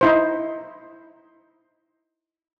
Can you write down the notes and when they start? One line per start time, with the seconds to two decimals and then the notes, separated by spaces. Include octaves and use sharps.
0.01 D#4 E4 C5